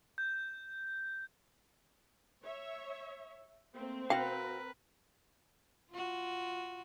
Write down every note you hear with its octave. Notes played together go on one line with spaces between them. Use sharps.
G6
C#5 E5
A3 A#3 C4
F#4 A#4 B4 F5 G5
F4 F#4